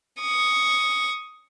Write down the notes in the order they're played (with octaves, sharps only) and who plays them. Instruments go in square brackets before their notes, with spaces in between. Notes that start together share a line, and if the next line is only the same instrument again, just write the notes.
[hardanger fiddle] C#6 D#6